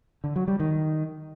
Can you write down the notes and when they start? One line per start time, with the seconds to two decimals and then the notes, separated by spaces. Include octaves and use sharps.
0.24 D3
0.36 F#3
0.48 G3
0.60 D#3